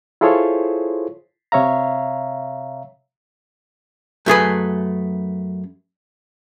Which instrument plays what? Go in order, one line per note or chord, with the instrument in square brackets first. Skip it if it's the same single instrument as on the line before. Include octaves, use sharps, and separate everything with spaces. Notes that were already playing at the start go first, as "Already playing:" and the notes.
[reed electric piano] E4 F4 G#4 A4 C5 C#5
C3 C#5 E5 F5 A#5
[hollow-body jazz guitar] F#2 A3 G#4 B4